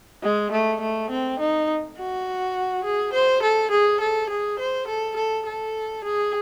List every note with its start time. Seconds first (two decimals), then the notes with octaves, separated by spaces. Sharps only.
0.23 G#3
0.52 A3
0.81 A3
1.10 C4
1.39 D#4
1.97 F#4
2.84 G#4
3.13 C5
3.43 A4
3.71 G#4
4.00 A4
4.30 G#4
4.59 C5
4.87 A4
5.16 A4
5.46 A4
6.04 G#4